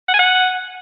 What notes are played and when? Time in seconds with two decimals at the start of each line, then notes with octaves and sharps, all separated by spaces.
0.08 F#5
0.14 G#5
0.19 F#5